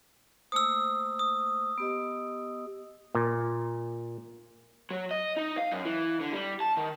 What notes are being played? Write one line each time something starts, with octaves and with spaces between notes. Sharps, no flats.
A3 A#3 C5 D#6 E6
D#6
B3 G4 D#5
A#2
F#3
D#5
D#4
F5
F#2
E3
D3
G3
A5
D#3